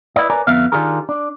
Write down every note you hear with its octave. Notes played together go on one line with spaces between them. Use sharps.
E4 B4 D5 D#5
A#4 B4 C#5 D5 G#5 A#5
F2 D3 B3 E5 F5
D#3 D4 F4 G4 G#4 A#4
D4